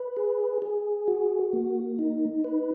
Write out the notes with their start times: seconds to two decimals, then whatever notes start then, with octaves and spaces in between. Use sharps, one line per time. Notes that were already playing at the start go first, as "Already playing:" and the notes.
Already playing: B4
0.17 G#4
0.62 G#4
1.08 F#4
1.53 A#3
1.99 D#4
2.44 B4